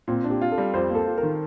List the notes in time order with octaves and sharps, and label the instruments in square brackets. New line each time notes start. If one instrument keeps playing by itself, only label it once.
[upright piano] A#2 [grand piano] C4
[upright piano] D4
[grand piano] G4
[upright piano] F4
[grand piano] A4
[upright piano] G3
[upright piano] F2 [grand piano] C5
[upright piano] A#3
[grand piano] A4
[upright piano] F4
[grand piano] A#4
[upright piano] D#3